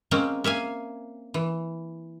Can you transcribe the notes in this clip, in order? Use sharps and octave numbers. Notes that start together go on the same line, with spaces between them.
G#3 A#3 C4 C#4
A#3 E5 F5 G#5
E3